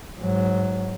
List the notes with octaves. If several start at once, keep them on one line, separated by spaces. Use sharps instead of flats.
G#2 F#3